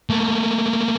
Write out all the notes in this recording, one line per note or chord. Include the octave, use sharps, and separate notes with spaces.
A3 A#3